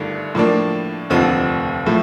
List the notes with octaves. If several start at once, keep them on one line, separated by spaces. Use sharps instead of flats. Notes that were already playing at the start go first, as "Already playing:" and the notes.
Already playing: G1 G2 D#3 A3
A2 F3 A#3 D4
F1 D#2 D3 F3 C4
A2 F3 A3